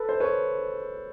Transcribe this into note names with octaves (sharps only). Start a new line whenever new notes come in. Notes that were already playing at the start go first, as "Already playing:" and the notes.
Already playing: A4 B4
C5
B4 C#5